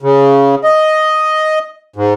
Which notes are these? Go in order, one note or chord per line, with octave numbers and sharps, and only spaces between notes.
C#3
D#5
G#2